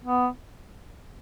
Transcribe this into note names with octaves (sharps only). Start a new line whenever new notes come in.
B3